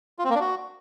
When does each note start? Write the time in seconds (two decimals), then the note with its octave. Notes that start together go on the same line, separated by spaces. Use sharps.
0.19 F4
0.24 C4
0.30 A#3
0.35 D4
0.41 F#4